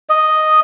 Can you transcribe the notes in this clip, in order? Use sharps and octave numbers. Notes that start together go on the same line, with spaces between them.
D#5